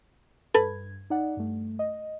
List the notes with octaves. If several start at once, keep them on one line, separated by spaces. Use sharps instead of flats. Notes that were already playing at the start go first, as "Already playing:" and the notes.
G2 A4 B4 B5 G#6
D#4 D5 F#5
G2 A3
D#5